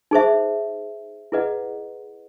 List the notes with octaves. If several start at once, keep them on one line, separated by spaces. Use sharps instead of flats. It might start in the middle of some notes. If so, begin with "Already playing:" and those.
D#4 G#4 C5 E5
E4 G#4 B4 D#5 F#5